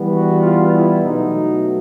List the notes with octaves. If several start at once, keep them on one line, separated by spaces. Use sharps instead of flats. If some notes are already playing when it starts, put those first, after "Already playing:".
Already playing: E3 G3 B3
F#4
F4
E4
B2 F#3 A3 D#4